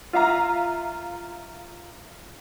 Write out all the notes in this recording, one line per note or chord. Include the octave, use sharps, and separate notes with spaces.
F4 E5 F5 A#5